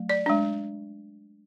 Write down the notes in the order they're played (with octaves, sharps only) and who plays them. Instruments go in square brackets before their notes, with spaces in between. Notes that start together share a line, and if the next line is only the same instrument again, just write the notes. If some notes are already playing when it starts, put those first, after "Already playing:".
Already playing: [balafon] F#3 A3
D5
G#3 D4